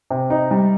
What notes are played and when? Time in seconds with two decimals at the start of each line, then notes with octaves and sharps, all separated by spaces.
0.10 C3
0.30 D#4
0.51 G3